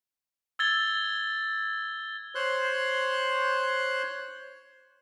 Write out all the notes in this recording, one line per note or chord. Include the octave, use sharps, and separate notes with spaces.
E6 G#6 A6 G7
C5 C#5 C6 F#6